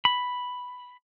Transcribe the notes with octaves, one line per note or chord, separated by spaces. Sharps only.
B5